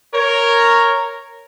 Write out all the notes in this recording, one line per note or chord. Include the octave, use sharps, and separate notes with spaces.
A#4 C#5